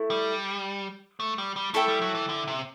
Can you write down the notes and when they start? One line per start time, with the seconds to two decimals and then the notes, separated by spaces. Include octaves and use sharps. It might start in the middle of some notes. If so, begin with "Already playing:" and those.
Already playing: A3 E4
0.10 G3
1.20 A3
1.38 G3
1.56 G3
1.74 A3 E4 A4 E5 G5
1.88 G3
2.02 F#3
2.15 E3
2.29 D3
2.47 C3